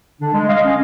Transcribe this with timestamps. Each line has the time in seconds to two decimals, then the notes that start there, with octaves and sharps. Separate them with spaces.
0.21 D3 D4
0.33 G#3
0.48 D#5 F5
0.64 C#4